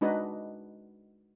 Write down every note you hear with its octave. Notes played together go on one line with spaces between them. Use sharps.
G#3 D4 D#4 F#4 B4 D#5